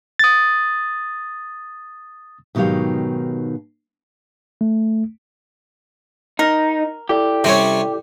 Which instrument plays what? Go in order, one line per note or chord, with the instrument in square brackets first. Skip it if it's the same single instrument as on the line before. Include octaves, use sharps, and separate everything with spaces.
[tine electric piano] D#6 A6
[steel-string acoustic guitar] G#2 B2 D#3 F#3 G4 F5
[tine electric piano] A3
[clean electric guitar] D#4 [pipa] A#4
[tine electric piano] E4 A4 D5 [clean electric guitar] G4
[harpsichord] C3 G3 C#4 [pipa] C4 C#5